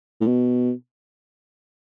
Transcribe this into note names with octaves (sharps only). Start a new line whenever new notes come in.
A2
B2